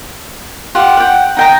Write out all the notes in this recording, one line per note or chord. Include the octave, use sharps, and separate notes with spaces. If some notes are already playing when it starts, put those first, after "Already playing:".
F4 G4 F#5
F#5 G5
D#4 G5 A#5